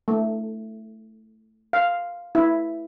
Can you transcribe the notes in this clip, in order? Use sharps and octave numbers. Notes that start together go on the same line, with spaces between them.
A3
F5
E4